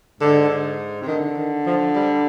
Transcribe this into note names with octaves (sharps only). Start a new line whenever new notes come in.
G#2 D3
C3
D3 D#3
D#3
F3
G3